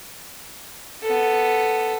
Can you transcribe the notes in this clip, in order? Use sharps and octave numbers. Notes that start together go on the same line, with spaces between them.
B3 A4